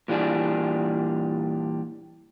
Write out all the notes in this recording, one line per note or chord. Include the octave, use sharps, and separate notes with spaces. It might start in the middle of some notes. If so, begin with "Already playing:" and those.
A#2 E3 G3 D4 G#4